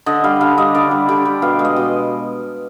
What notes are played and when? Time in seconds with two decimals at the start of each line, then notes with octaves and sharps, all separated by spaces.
0.06 D3 D#5
0.24 G3 F5
0.41 D3 F5
0.58 G3 D#5
0.75 D3 D5
0.91 G3
1.09 D3 G4
1.25 G3
1.42 B2 F5
1.59 G#3
1.65 D#5
1.76 B2